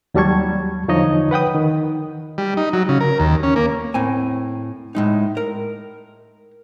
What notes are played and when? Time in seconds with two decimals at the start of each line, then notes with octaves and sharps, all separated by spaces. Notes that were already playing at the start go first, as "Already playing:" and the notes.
0.14 D#2 F#3 G3 A5 C#6 G#6
0.88 E2 D3 F3 D#4 C#5 D#5
1.31 B4 F#5 G5 D#6
1.55 D#3
2.38 G3
2.57 D#4
2.73 F#3
2.89 C#3
3.01 A#4
3.20 D#2
3.43 C#4
3.56 A#3
3.94 A2 C4 G#5
4.95 A2 G#3 D#4
5.37 A#4